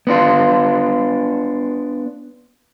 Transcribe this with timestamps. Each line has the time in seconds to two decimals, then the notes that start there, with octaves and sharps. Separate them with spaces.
0.07 B3 D4 F4